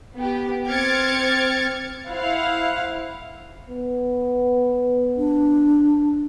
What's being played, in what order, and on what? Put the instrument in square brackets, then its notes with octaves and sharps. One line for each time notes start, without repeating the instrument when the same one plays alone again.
[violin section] B3 G4
C4 D6 F6 G#6 A6 C#7
[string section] E4 C5 F5 F#5
[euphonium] B3
[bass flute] D4